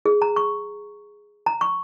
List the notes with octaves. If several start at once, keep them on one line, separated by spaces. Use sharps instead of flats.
G#4
A#5
C#6
A#5
C#6